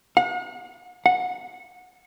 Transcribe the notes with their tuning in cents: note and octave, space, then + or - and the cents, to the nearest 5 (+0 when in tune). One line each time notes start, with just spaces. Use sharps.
F#5 -45
F#5 -15